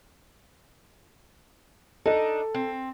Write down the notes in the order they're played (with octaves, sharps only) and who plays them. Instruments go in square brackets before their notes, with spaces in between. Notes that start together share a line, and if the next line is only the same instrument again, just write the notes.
[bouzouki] D4 D#4 [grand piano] A4
[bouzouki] C4